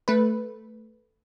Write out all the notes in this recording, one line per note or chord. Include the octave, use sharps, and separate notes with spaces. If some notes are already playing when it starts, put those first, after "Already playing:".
A3 B4